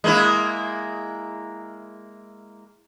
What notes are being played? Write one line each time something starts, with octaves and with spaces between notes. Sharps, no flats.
G#3 A#3 E4